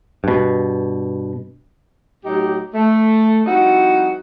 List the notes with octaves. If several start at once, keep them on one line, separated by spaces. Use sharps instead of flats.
G2 B2
A2 F#3 D#4 G4
A3
F3 G3 C4 D#4 E4 F#4